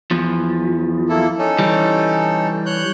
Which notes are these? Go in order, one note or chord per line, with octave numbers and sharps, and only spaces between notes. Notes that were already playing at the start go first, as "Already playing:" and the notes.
E2 F3
A#3 E4 A4
C#4 D#4 A4
E3 G3
C#5 F#6 G6